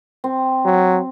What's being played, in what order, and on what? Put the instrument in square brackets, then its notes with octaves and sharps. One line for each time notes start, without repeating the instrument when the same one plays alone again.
[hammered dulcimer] C4
[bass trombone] F#3